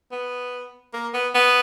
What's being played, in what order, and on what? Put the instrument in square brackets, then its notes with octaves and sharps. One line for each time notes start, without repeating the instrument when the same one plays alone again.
[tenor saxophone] B3
A#3
B3
B3